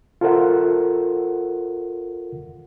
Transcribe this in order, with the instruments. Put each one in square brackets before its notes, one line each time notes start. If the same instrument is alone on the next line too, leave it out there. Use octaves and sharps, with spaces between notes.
[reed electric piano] F4 A4 A#4 C5 E5 F#5